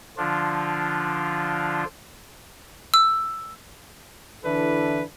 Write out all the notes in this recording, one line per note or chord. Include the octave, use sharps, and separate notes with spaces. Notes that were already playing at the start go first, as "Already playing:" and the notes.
D3 F3 D4 F4
E6
D3 E3 D4 E4 A4 B4